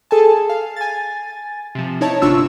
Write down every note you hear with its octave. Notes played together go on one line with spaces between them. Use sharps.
G#4 A4 G#5 A5
F5
G#5 A6
C3 F3
D#4 E4 C#5 A5
G1 C3 D4 F4 C#6 E6